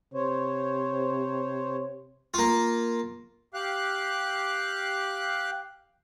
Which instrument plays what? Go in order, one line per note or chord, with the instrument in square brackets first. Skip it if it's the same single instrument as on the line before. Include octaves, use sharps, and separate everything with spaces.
[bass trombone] C3 [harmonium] C5 C#5
[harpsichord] A#3 F4
[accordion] G4 F5 F#6